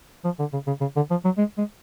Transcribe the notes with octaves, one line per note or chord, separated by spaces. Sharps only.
F3
D3
C#3
C#3
C#3
D3
F3
F#3
G#3
G#3